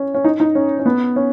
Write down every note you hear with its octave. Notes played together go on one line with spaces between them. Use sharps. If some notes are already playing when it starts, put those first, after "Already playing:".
Already playing: C#4
C#4
D#4
D#4
C#4
C#4
B3
C#4